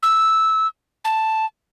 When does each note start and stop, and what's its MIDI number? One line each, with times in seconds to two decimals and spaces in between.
0.03 0.67 88
1.05 1.45 81